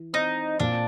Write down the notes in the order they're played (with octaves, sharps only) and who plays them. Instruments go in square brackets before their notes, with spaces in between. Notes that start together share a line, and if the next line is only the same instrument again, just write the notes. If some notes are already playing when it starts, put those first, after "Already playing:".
Already playing: [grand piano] E3
[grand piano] C4 [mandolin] D#4
[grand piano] A#2 [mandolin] D4